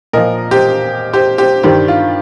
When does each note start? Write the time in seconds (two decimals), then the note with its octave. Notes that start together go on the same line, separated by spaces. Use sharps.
0.13 A#2 F3 A#4 D#5
0.51 G4 C5
1.13 G4 C5
1.38 G4 C5
1.63 G2 D#3 G3 G4 C5
1.88 F4